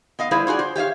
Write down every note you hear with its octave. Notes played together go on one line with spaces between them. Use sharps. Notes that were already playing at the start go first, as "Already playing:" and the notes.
B3 D#5 F5
G3 E4 G#4 B4 C5 F5
F4 F#4 G#4 D5
C5
G4 C#5 E5 F5